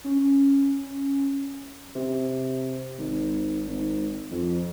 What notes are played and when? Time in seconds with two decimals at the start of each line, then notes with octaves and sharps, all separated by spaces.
0.04 C#4
1.95 C3
2.98 G#1
3.67 G#1
4.31 F2